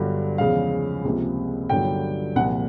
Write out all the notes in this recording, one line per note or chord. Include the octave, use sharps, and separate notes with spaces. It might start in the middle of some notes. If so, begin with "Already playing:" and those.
Already playing: G1 G2 D3 F#3
E2 C#3 F3 G#3 F5
C#2 C3 F3 A#3
G1 G2 D3 F#3 G5
C2 A#2 F3 F#5